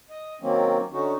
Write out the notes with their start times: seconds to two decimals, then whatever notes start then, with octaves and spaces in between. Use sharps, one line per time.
0.10 D#5
0.41 D#3 F#3 A#3 C4 C#4
0.92 D3 C#4 D#4 F#4